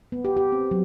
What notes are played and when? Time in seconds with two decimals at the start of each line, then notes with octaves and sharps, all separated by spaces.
0.12 B3
0.25 G4
0.37 G4
0.52 C4
0.71 F#3